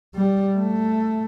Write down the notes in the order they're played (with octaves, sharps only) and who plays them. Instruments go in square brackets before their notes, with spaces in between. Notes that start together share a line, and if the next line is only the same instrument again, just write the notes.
[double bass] G3
A3